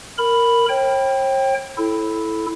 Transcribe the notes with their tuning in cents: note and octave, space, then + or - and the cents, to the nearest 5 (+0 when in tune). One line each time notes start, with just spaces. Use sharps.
A#4 -5 B5 +0
C#5 -45 G5 +0
E4 +0 A4 -15